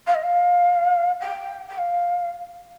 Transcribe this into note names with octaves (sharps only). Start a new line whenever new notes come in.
F5
D#5
F5
G5
G5
F5